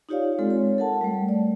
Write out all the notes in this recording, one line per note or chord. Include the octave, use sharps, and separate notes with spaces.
D#4 F4 G4 C#5 D5 F5
G#3 C4 F4 A4
C#5
A4 A#4 F#5 A5
G3 A3
D5